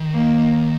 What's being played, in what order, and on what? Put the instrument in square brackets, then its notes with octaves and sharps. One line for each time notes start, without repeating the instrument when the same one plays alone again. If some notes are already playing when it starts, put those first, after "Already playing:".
Already playing: [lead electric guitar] D#3
[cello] A#3